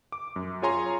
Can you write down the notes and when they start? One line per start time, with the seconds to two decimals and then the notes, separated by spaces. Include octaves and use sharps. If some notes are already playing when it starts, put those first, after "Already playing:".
0.12 D6
0.36 F#2
0.62 F4 G#4 C#5 G#5 A#5 C6